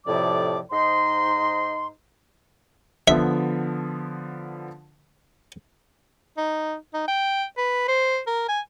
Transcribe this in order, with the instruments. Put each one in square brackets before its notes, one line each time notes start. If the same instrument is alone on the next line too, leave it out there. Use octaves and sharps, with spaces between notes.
[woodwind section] F2 A2 C3 F3 D5 D6
G#2 D#4 C5 D#5 C6
[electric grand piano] D3 F3 B3 [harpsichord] E5
[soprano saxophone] D#4
D#4
G5
B4
C5
A#4
G#5